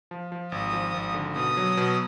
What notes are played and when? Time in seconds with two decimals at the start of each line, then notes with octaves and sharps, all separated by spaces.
0.11 F3
0.32 F3
0.52 G#1 D#6
0.73 F3
0.94 G#1
1.14 D3
1.35 B2 D#6
1.57 F#3
1.77 B2